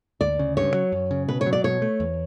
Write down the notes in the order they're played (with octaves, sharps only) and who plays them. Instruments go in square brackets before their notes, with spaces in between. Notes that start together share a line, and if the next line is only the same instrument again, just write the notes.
[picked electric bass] D2 [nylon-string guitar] D5
[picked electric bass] C#3
[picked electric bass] G2 [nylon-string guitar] C#5
[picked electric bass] F#3
F#2
C#3
[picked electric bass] B2 [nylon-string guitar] B4
[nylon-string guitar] C#5
[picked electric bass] F#3
[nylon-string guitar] D5
[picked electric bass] B2 [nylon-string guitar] C#5
[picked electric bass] A3
E2